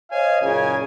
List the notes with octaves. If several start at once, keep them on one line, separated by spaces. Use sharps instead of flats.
C5 C#5 D#5 F5 G#5
F#1 A#2 C#3 G#5